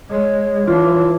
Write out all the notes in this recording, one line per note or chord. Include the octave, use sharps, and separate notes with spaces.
G#3 C#5
E3 D4 F4